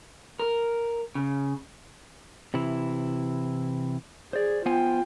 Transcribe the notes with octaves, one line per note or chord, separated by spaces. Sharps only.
A#4
C#3
C3 E3 E4
G#4 C5 D5
B3 F4 C5 G5 G#5